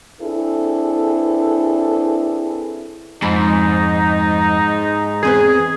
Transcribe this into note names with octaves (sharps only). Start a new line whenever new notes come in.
C4 D4 E4 G#4 A4 B4
F2 G#2 D#4 B5
E2 C4 G#4 B4